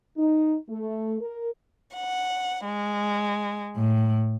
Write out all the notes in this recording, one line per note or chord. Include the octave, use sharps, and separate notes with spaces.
D#4
A3
A#4
F#5
G#3
A2